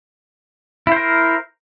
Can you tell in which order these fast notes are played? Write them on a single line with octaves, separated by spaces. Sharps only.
E4 C5 A#4